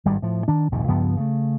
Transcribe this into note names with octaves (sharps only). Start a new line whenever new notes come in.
G#1 G2 G3
A2 F3
D#3 D4
A#1 D#2 G#2 C3
C#2 G2 F3 B3
C#3 A3